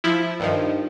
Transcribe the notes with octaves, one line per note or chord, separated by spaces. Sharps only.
F3 E4
G2 D#3 F3